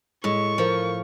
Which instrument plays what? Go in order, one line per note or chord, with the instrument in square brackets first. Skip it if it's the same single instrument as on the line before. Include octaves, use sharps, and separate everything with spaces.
[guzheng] A2 [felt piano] G#3 [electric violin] C#6
[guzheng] F3 [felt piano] A#4